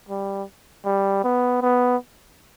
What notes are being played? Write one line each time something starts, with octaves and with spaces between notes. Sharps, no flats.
G3
G3
B3
B3